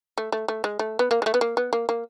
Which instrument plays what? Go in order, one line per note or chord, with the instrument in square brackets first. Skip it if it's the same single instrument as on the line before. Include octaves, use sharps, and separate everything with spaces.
[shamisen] A3
A3
A3
G#3
A3
B3
A#3
G#3
A3
B3
A#3
B3
A#3
A#3